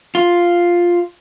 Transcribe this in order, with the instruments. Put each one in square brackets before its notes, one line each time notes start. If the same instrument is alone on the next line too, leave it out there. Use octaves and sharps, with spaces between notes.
[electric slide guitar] F4